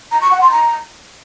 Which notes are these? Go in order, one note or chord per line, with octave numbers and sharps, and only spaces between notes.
A#5
C#6
F#5
C6
A#5